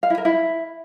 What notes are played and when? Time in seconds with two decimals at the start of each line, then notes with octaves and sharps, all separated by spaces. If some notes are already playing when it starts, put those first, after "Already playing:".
0.03 F5
0.10 E4
0.18 A#4
0.25 E4